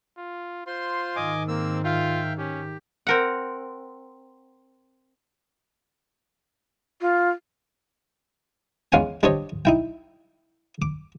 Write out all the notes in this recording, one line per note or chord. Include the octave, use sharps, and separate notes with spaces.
F4
F4 C5 C6
G#2 D#3 D#5 G#5 D6
A#3 C4 E6
F4 E5 F5 G5
C#4 G4
C4 A#4 F#5
F4
E2 G#3 C#4 F5 F#5 G#5
G3 D4 G4 C5 C#5 D#5
D#4 E4 G5
D6